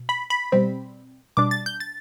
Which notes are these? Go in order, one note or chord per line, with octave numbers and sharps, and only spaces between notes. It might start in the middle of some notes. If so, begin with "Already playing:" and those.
Already playing: B2
B5
B5
B2 G3 C4
B2 G3 D4 D6
A6
G6
A6